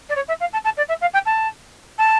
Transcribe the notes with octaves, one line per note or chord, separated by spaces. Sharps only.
D5
C#5
E5
F5
A5
A5
D5
E5
F5
G5
A5
A5